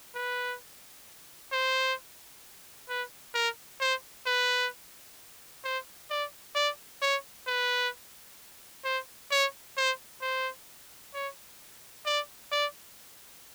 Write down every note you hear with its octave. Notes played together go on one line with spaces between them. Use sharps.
B4
C5
B4
A#4
C5
B4
C5
D5
D5
C#5
B4
C5
C#5
C5
C5
C#5
D5
D5